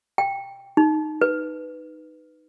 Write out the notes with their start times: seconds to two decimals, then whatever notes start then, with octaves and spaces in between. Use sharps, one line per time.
0.18 G5
0.77 D#4
1.21 B4